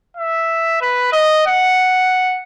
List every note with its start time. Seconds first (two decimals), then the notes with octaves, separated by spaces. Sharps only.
0.17 E5
0.82 B4
1.12 D#5
1.46 F#5